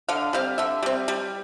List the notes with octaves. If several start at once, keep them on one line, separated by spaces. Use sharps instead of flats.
D3 F5
G3 C4 F5
D3 E5
G3 C4
G3